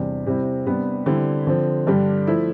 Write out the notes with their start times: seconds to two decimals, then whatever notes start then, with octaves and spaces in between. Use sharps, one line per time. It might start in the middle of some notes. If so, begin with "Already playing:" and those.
Already playing: E2 C3 G3 D4
0.26 C3 G3 C4 E4
0.67 C3 G3 B3 D4
1.06 D3 G3 C4 E4
1.47 D3 F3 C4
1.87 G2 D3 G3 D4
2.27 F3 A3 E4